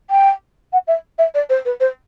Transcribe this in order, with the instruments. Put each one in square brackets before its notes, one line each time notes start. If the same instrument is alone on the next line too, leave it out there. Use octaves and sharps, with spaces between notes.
[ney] G5
F#5
E5
E5
D5
C5
B4
C5